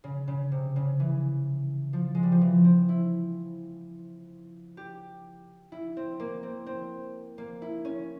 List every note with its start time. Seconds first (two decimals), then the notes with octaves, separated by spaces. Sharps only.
0.04 C#3
0.28 C#3
0.52 C3
0.76 C#3
1.00 E3
1.93 F3
2.15 G#3
2.23 G3
2.32 F3
2.41 E3
2.64 C4
2.89 E4
4.77 G4
5.72 E4
5.97 C4
6.20 A#3
6.43 C4
6.66 C4
7.38 A#3
7.62 E4
7.85 C#4